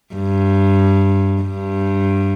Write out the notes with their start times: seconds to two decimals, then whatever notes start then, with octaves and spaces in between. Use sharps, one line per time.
0.15 G2
1.42 G2